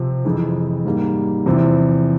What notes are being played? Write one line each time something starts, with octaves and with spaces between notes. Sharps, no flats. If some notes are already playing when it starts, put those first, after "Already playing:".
Already playing: C3 F3 C4
F2 C3 E3 G#3
G#2 G3 A#3
E2 C3 F3 C4 E4